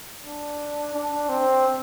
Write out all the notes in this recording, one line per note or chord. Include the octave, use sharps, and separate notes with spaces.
D4
D4
C4